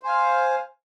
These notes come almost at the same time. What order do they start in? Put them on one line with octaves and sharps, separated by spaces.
C5 G#5 F5